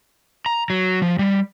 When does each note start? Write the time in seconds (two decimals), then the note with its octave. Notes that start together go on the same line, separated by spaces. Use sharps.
0.46 A#5
0.70 F#3
1.02 F3
1.19 G3